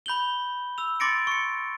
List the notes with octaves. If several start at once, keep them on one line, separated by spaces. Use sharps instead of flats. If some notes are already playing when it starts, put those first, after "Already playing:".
B5 G6 F#7 G7
E6 F7
C6 D6 A6 A#6 C#7 D7
C#6 C#7